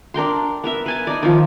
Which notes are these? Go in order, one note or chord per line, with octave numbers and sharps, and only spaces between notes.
D4 A#4 G5 C6
B3 A#4 E5
B4 G#5 A5
D#4 D5
D#3 F3